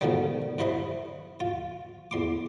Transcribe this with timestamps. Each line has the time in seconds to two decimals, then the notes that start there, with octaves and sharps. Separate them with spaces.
0.01 G#2 B2 D3 D#3 F3 G3
0.58 G2 E3 B4 C5 D#5 B5
1.40 F4
2.11 E2 C6 D6